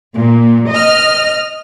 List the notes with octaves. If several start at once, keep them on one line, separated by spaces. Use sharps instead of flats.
A#2
D#5 F6